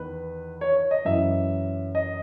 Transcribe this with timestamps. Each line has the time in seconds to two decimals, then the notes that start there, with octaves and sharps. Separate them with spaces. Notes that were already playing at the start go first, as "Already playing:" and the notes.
Already playing: E2 D#3 B4
0.61 C#5
0.77 C#5
0.91 D#5
1.05 F#2 E3 E5
1.95 D#5